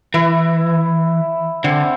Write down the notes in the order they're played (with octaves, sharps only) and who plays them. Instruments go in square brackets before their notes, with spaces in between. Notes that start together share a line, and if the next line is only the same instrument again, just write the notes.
[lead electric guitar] E3 [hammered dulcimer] E4
[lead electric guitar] D3 [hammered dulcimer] C4